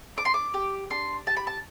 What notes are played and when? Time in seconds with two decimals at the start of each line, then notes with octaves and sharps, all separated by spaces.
0.17 D4 D6
0.25 C6
0.34 D6
0.54 G4
0.90 D4 C6
1.27 G4 A5
1.37 B5
1.47 A5